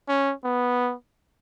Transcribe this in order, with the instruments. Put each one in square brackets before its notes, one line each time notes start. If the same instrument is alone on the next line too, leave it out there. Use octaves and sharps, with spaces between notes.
[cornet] C#4
B3